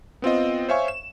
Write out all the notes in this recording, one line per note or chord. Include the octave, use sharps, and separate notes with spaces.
B3 C4 F4 D#5
C5 C#5 E5 F5 G#5 C#6
E7